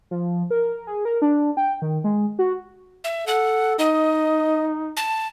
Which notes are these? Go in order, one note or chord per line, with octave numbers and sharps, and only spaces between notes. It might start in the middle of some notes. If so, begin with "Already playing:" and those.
F3
A#4
G#4
A#4
D4
G5
D#3
G#3
F#4
E5
A4 F#5
D#4 D#5
A5